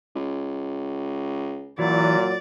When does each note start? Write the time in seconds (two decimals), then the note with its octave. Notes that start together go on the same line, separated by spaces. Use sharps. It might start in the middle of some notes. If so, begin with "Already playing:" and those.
0.15 C#2
1.79 A#2 E3 F#3 D5